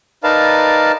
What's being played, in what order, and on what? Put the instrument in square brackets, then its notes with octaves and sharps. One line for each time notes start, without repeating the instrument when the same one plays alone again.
[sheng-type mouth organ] D#4 A#4 B4 D5 F5 A5